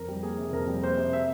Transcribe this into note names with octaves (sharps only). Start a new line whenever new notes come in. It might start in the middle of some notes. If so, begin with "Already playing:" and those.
Already playing: F2 A#4
G3
A#3 G#4
C3
F2 A#4
G3
A#3 C5
C3
E5